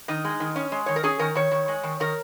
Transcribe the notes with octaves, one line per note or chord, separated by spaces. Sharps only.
D#3 D#4
G#3
D#3
C#4
G#3
D#3 C#5
A#4
C#4 G#4
D#3 A#4
D#3 C#5
D#3
G#3
D#3
D#3 A#4